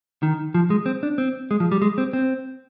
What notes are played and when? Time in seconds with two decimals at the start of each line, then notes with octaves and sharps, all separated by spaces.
0.23 D#3
0.54 F3
0.70 G#3
0.86 C4
1.03 D4
1.18 C4
1.51 G#3
1.60 F3
1.72 G3
1.82 G#3
1.98 C4
2.13 C4